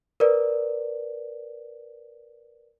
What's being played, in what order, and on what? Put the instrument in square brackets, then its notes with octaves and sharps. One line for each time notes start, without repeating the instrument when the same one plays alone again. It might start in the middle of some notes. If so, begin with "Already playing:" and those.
[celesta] A#4 B4 D5